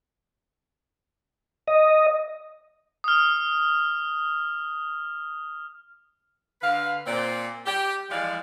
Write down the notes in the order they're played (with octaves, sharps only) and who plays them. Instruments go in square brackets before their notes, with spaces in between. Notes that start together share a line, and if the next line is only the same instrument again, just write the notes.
[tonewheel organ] D#5
[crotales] D#6 F6
[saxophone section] D3 B4 F5
A#2 C4 D5
G4
E3 F3 G3 G#3 D5 F5